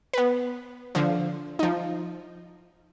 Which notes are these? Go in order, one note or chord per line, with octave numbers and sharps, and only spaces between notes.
B3 B4
D3 F3
F3 D#4